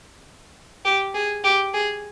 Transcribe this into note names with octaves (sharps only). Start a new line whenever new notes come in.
G4
G#4
G4
G#4